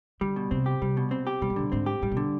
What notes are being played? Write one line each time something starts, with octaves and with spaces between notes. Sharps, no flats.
D3 G3
B2
C3 C4
G4
C3 G3
B2
C4
G4
B2 G3
G#2
B2 D3
G#2 C4
G4
G#2 G3
B2
D3